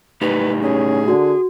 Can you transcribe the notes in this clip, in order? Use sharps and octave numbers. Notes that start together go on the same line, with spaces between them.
A2 D#4 G4 B4
C#4 G#4
D3 F#4